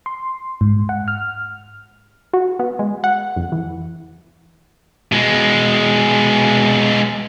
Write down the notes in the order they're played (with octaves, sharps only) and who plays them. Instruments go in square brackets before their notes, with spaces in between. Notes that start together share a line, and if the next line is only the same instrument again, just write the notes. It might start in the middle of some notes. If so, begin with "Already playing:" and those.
[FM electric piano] C6
G#2
F#5
F6
[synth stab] F#4
B3
G#3
F#5
F2
E3
[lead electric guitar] B2 G#3